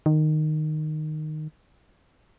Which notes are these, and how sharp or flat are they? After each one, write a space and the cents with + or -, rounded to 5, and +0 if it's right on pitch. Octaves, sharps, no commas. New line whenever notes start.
D#3 -15